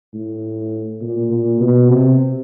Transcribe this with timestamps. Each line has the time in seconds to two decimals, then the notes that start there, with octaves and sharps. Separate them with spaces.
0.13 A2
1.01 A#2
1.31 A#2
1.61 B2
1.90 C3